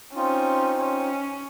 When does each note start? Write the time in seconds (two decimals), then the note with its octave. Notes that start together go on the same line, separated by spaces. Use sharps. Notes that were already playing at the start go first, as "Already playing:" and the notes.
0.15 C4 C#4 D#4 F4
0.78 C#4